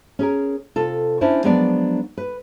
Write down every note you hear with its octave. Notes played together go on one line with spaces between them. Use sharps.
C#4 G#4 A#4
C3 F4 A4
C#4 D4 E4 C5
F3 F#3 G#3 B3 D4 D5
B4